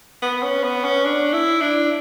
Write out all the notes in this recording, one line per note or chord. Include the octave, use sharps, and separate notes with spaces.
B3
C#4
B3
C#4
D4
E4
D4